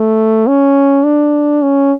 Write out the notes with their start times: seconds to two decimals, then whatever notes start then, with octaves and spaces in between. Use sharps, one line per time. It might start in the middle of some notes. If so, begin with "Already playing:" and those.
Already playing: A3
0.47 C#4
1.05 D4
1.62 C#4